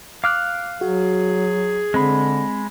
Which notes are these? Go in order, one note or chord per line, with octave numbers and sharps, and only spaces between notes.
F5 D6 F6 F#6
F#3 F#4 G#4
D3 G#3 C4 B5